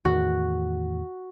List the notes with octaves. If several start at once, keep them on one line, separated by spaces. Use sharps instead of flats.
E2 A2 D#3 F#4